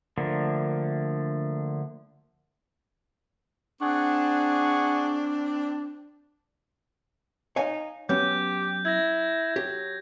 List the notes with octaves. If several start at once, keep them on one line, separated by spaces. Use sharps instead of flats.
D3 F3 A3 A#3 D4
C4 D4 G#4 F#5 C#6
D#4 C#5 F5 G#5
F#3 B3 C#4 G4 G6
E4 G#6 A#6
F#3 G4